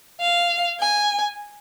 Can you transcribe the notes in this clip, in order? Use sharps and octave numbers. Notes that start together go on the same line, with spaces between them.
F5
G#5